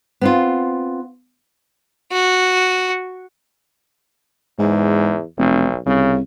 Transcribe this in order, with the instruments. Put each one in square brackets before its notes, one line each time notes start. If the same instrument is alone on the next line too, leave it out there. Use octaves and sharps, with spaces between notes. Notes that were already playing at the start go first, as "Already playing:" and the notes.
[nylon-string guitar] B3 C4 F4
[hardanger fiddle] F#4
[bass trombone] E2 [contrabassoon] G#2
[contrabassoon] F1 [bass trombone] B1
[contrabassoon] C2 [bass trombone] C#3